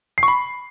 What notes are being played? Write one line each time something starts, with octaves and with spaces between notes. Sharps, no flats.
C7
C#6
B5